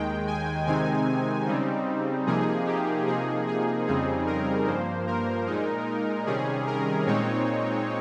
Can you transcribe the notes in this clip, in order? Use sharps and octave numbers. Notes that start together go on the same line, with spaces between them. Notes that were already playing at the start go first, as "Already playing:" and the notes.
Already playing: D#2 D#3 G#3 G5
G#5
C3 D#3 G#3 C4 D#4 G#5
C#3 G3 C4 D#4
C3 F3 A#3 D#4 G#4
G4
C3 F3 A#3 D#4 G#4
G#4
F2 C#3 G3 C4 D#4 G#4
A#4
G2 F3 A#3 C5
A#4
A#2 G#3 D#4
C3 D#3 G3 C#4 G#4
A#4
A#2 G#3 C4 D#4 C#5